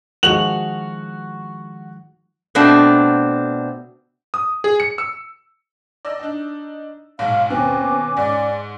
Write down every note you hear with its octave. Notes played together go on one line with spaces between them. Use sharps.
D#3 F3 G#3 F#4 F7 F#7
B2 A3 C4 D4
D#6
G#4
C#7
E6
D5 D#5 E6
D4 D#4
B1 G#2 F5
D#2 B2 C4 C#4 G#5 D6
G#2 D5